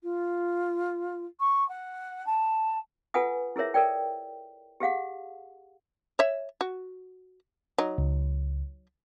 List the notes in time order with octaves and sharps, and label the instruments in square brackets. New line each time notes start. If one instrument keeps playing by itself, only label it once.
[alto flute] F4
C#6
F#5
A5
[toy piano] F4 A4 B4 F#5 G#5 D#6
E4 G#4 A#4 C#5 E5
A4 A#4 D5 G5
G4 G#4 F5 F#5
[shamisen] C#5 E5
F#4
F#3 D#4
[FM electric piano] C#2